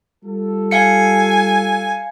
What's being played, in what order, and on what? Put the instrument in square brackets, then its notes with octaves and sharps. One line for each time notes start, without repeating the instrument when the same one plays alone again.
[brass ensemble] G3 F4 A4
[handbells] F5 C#7 [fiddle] G#5